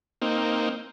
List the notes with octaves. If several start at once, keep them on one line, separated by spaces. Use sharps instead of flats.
A#3 C4 D#4